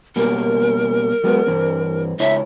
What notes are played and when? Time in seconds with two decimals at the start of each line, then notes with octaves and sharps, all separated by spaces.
0.16 B2 G3 A#3 A#4
1.24 F#3 G#3 B3
1.47 G2 E3 C4
2.20 C#2 E4 C#5 E5